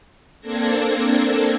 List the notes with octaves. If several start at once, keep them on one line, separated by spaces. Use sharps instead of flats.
A#3 C4 D4 A4 G#6 A#6